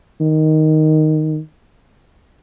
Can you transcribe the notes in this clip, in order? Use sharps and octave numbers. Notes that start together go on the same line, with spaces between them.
D#3